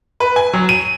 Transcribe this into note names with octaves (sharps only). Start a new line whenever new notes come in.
B4
G#5
F#3
D#7